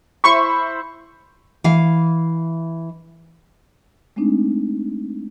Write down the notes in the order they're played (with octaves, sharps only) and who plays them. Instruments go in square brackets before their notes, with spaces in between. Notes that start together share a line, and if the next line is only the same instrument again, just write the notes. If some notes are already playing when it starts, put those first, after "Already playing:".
[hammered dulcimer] E4 C5 B5 [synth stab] C#6
[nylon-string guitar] E3 F5
[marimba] G#3 A3 C4 D4 D#4